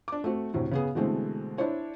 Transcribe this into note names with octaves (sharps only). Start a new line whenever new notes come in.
D4 D6
A3 C4 F#4
D2 A2 C3
C#3 B3 G#4
B2 D3 E3 G#3 A3 C4
D4 E4 C5 C#5